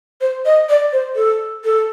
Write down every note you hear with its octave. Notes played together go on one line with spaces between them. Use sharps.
C5
D#5
D5
C5
A4
A4